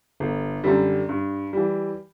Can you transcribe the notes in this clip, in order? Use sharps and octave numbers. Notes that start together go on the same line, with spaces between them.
G1
F#2 D3 G3
G2
E3 G3